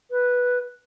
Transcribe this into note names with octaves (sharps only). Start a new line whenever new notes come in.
B4